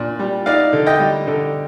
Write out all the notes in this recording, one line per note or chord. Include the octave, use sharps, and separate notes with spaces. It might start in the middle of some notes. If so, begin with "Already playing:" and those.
Already playing: A#2 D4
G3
D#4 D5 F5
D3
D#5 G5
G3
D3